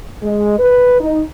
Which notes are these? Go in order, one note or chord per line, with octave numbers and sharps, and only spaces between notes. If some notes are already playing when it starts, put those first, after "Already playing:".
G#3
B4
D#4